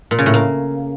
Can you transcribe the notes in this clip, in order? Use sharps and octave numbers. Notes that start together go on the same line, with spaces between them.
A#2
C#3
A2
A#3